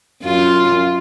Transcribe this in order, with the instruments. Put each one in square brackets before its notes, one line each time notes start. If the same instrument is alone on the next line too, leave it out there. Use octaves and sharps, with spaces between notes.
[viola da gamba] F#2 F4